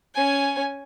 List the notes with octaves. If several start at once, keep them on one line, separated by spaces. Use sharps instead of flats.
C#4 G#5